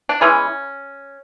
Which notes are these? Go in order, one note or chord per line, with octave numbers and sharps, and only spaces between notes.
D4
E3 G#3 B3 C#4